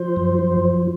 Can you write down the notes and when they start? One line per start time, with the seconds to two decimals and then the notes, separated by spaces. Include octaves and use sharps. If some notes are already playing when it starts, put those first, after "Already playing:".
Already playing: F3 C5
0.16 F#2
0.39 F3